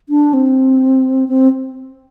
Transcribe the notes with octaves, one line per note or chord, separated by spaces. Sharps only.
D4
C4
C4